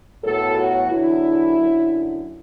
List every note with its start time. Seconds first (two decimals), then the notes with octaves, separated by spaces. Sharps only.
0.23 A2 F#3 B3 A4
0.57 F#4
0.90 E2 D3 F#3 E4
1.58 F#2 D3 F#3